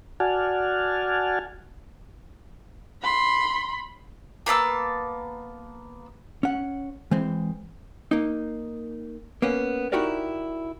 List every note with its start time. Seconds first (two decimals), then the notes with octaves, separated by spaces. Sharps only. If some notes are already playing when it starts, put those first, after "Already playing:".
0.20 F#4 D5 F#5 G#5 A5 F6
3.02 B5 C6
4.46 A#3 B3 A5 E6
6.43 C#4 F#5
7.11 E3 G#3 C4
8.11 A#3 D#4
9.42 A#3 B3 C#4
9.92 D#4 E4 F#4 G4 A#4 D5